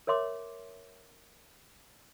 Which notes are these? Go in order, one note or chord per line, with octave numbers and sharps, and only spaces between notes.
A#4 C#5 E5 C6 D6